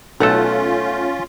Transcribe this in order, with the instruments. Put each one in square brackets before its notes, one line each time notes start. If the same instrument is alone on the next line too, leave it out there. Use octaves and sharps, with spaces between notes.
[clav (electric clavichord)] B1 A4 [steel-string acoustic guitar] A3 F#5 [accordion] C#4 F4